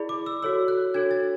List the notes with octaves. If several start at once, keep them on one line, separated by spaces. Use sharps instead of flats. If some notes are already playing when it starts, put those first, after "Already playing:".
Already playing: E4 G#4 D5 B5
D6
E6
F#4 A4 C#5 E6
F#6
D4 F#4 A4 C#5 G#6
A6